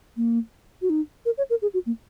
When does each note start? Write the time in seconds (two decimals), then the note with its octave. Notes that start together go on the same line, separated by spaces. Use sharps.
0.17 A#3
0.82 F#4
0.90 D#4
1.25 A#4
1.38 C#5
1.50 A#4
1.62 G#4
1.74 F#4
1.86 A#3